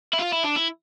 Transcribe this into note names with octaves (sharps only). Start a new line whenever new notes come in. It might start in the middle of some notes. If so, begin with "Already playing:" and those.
E4
F4
E4
D4
E4